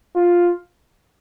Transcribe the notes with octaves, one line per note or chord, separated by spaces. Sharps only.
F4